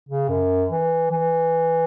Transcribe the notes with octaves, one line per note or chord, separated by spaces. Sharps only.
C#3
F#2
E3
E3